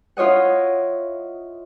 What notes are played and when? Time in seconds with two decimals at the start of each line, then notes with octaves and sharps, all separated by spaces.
0.17 E4 F4 C#5 D#5 F#5